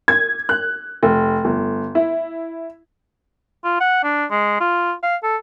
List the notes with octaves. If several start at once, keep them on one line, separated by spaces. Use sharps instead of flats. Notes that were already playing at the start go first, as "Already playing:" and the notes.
G#6
F#6
F1
G1
E4
F4
F#5
D4
G#3
F4
F5
A4